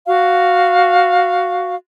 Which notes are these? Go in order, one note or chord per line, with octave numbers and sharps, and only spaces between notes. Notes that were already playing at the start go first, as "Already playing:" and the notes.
F#4 F5